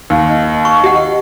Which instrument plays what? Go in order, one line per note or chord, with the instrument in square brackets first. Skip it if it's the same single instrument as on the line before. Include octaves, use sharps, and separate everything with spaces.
[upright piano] D#2
[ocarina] D#5
[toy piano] C#6
G4 F#5